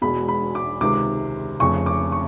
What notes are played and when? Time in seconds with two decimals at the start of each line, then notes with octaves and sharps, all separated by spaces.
0.02 E1 E2 B2 G#3 B5
0.28 B5
0.55 D6
0.81 C#2 C3 D#3 D6
1.60 F1 F2 C#3 C#6
1.86 D6
2.12 C#6